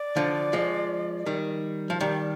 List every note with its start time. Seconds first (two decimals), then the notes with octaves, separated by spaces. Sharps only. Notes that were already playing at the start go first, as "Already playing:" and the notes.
Already playing: D5
0.16 D3 F3
0.53 F3 G#3
1.26 D#3 G3
1.90 F3
2.00 D#3 G3 D5